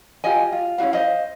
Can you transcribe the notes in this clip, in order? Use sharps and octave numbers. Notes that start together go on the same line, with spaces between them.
F4 G4 D#5 G#5
F4
C#4 E4 F#4 F5
C5 D#5 F5